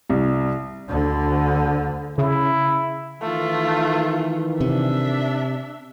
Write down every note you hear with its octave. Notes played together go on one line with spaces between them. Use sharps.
C2
D2 D3
C#3 E4
D#3 E3 A3 F4
C3 D4 E5